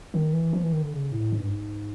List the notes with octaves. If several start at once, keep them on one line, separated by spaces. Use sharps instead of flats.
D#3
E3
F3
E3
D#3
D3
C#3
A2
G#2
G2
G#2